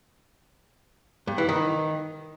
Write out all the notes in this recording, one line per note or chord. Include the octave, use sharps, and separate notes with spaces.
G2
E3
D#3